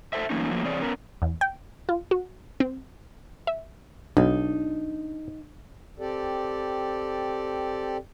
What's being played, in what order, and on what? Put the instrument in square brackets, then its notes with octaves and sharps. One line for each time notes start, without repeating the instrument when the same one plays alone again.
[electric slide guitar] A4 C5 E5
E3 F#3 A3 A#3 C#4 D#4
F3 F#3 A3 A#3
C3 E3 C4 G#4 C#5 D5
B3 C#4 A#4
[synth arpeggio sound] E2
G5
F4
F#4
C4
E5
[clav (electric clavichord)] B1 [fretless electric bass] D4 [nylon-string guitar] D#4
[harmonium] C4 G4 A4 D5